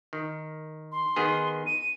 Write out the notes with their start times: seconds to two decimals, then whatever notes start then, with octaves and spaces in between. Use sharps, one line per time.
0.13 D#3
0.92 C6
1.16 D#3 B3 G#4
1.66 D#7